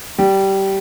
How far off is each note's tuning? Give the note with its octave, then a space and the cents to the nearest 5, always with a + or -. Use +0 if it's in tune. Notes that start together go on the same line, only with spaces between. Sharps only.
G3 -15